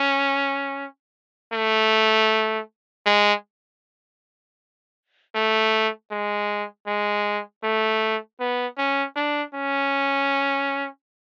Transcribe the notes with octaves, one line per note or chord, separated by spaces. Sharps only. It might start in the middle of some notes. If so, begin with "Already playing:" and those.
Already playing: C#4
A3
G#3
A3
G#3
G#3
A3
B3
C#4
D4
C#4